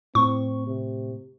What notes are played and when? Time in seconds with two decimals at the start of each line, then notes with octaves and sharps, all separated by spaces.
0.15 A2 C4 C#6
0.67 C3